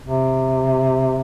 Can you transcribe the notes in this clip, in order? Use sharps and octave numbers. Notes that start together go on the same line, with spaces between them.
C3